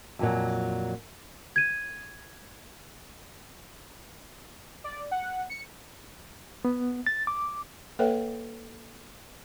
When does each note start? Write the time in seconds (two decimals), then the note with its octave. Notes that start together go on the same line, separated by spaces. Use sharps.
0.19 F2 A#2 F#3
1.56 G#6 D#7
4.84 D5
5.11 F#5
5.50 C#7
6.65 B3
7.06 A6
7.27 D6
7.99 A#3 A4 B4 C#5 E5 G5